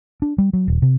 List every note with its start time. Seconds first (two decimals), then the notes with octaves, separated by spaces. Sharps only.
0.22 D4
0.38 G3
0.53 F#3
0.68 D#1
0.82 C3